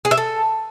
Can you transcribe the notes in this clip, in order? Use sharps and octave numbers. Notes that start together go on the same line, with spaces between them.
G#4
E5
A4